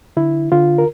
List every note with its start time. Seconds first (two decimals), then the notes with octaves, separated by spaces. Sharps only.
0.17 D3 E4
0.52 D3 F4
0.78 A#4